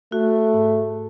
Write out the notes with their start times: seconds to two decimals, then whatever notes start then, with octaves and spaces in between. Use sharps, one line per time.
0.12 A3 F#4
0.54 G#2